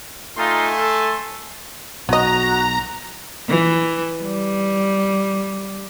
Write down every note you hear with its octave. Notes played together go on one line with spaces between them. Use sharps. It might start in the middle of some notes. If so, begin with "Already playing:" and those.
A3 D#4 F4 G#5 C6
A4
B1 F#3 F#4 D#5 A#5
E3
G3